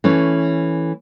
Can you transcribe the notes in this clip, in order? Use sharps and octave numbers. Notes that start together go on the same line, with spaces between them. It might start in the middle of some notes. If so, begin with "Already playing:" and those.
E3 A3 C#4